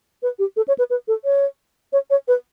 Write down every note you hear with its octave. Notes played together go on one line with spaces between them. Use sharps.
B4
G4
A4
C#5
B4
B4
A4
C#5
C#5
C#5
B4